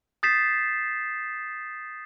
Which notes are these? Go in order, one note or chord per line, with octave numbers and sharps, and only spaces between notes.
D#6 G6 A6 B6 C7 E7